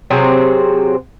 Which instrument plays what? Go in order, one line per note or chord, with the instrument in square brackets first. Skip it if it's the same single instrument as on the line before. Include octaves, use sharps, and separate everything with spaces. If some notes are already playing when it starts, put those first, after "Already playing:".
[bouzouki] C3 F#3 C4 G#4